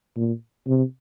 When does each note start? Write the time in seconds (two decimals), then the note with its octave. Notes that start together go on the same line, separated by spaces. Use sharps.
0.16 A#2
0.67 C3